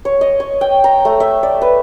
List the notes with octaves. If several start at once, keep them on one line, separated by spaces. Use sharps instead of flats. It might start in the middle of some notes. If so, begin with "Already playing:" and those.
C#5
D#5
C#5
G5
A#5
A3
E5
D5
B4